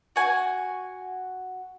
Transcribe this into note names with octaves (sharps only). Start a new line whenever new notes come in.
F#4 G#5